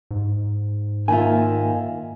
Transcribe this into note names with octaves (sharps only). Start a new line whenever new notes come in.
G#2
D#3 A#3 F4 E5 G#5